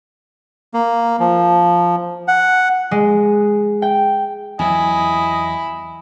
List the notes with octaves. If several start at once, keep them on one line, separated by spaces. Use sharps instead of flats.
A#3
F3
F#5
G#3
G5
E2 F#3 E4 D#5 G#5